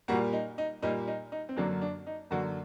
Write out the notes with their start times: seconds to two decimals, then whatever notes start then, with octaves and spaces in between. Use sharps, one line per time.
0.08 A#2 G3 A#3 F#4
0.33 D#4
0.58 D#4
0.82 A#2 G3 A#3 D#4
1.08 D#4
1.32 D#4
1.49 C4
1.56 F#2 D3 F#3 A#3 D4
1.81 D4
2.07 D#4
2.31 F#2 D3 F#3 A#3 F#4